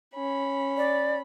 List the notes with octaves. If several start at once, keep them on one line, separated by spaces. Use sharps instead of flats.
C#4 B5
D5